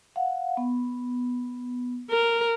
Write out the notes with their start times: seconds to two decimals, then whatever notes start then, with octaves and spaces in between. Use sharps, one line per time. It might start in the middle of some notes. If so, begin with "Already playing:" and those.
0.16 F5 F#5
0.57 B3
2.10 A#4